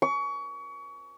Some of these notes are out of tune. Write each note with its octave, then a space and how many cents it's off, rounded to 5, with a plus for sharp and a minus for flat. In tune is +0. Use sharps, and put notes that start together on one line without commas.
C#6 +30